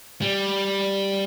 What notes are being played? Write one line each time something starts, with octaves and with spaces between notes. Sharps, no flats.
G3